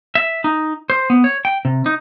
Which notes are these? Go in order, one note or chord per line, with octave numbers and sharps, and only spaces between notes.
E5
D#4
C5
B3
C#5
G5
C3
D#4